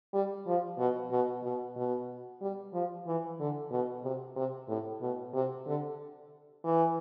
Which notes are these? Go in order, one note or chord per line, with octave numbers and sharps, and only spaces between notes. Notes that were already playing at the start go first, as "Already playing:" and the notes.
G3
F3
B2
B2
B2
B2
G3
F3
E3
D3
B2
C3
C3
A2
B2
C3
D3
E3